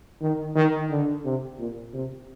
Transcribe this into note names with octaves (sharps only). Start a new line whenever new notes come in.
D#3
D#3
D3
C3
A#2
C3